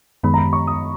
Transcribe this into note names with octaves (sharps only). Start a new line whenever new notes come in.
F#2 D#3 G#3 B3 B5
A#5
B5
C#6
D#6